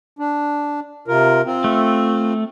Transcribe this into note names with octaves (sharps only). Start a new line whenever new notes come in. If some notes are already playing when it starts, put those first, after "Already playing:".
D4
C3 F4 A#4
C4 F4
A3